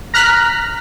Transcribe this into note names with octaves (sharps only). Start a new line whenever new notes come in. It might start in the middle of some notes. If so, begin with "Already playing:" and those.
A#5 F6 F#6 B6